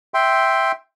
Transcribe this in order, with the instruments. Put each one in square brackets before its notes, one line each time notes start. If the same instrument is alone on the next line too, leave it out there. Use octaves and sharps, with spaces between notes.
[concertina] E5 G5 C6